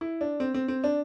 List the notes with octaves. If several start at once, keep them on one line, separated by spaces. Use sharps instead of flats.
E4
D4
C4
C4
C4
D4